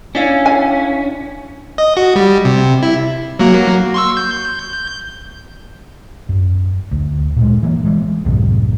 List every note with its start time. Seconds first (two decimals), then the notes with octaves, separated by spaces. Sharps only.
0.15 C#4 D4 E4 F5
0.46 G#5
1.78 D#5
1.97 F#4
2.16 G3
2.45 C3
2.83 E4
3.39 F#3 A#3 F#4
3.94 C6 C#6 E6
4.17 G6
6.29 F#2
6.91 D2
7.36 A#2 G3 G#3
7.63 E3 A#3
7.85 E3 G#3
8.25 C2 F#2 A2 C3